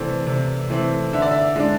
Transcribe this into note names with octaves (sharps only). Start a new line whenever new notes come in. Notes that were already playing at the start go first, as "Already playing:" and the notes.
Already playing: C3 E3 A3 C4 D5
C3
E3 A3 C4
D3 E5
D5
E5
G#3 D4